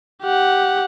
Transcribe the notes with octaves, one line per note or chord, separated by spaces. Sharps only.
G4 F#5